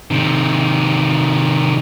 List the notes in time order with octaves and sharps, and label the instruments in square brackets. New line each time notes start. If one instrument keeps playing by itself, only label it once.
[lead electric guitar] C3 D#3